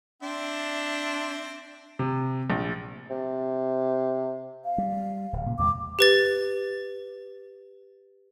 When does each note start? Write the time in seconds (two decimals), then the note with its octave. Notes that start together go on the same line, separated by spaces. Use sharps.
0.22 C4 D4 E5
1.99 C3
2.50 A#1
3.10 C3
4.65 F5
4.78 G3
5.33 D1
5.46 A#2 C#3
5.58 E2 C3 G#3 D6
5.99 G4 B4 A6